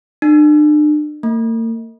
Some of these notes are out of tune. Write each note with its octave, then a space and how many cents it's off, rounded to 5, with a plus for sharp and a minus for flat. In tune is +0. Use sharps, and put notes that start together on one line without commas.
D4 +40
A#3 -45